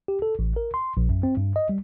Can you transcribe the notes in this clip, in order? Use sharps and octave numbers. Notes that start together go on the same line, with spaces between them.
G4
A4
A1
A#4
C6
A#1
F#2
C4
G2
D#5
G3